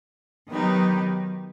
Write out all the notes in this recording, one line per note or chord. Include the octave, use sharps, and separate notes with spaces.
D#3 F#3 B3 D#4 G4